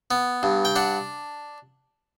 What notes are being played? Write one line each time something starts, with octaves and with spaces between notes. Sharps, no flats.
B3
G2
G5
D4 F#5